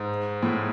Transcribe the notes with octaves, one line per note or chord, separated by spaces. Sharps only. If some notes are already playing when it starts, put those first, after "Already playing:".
Already playing: G#2
A2